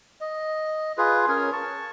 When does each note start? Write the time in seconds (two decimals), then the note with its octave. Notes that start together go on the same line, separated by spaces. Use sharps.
0.21 D#5
0.98 F4 G#4 B4
1.28 C#4 G#4 A#4 C#5
1.53 A5 C#6